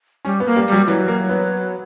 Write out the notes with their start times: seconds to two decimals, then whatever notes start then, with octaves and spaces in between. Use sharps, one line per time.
0.25 G3 C#4
0.40 B3
0.46 A#3
0.56 G3
0.67 F#3 G3
0.87 E3 F#3
1.08 A#3
1.29 B3